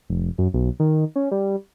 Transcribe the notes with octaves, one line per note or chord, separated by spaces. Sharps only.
F1
F#2
B1
D#3
C#4
G3